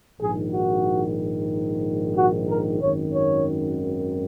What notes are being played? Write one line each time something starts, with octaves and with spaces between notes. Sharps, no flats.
A#1 G#2 D#3 G#4
F#4
F#4
A#4
G#1 F#2 D#3 C#5
C#5